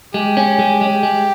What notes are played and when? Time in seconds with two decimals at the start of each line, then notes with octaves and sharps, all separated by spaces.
0.14 G#3 G4
0.37 C#4
0.59 G#3
0.81 G#3
1.03 G#3